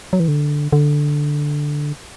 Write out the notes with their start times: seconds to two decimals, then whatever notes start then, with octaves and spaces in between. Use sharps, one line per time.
0.13 F#3
0.20 E3
0.28 D3
0.73 D3